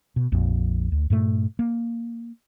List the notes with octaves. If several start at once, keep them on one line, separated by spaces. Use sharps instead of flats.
B2
A#1 F2
D2
G2 A#2 A3
A#3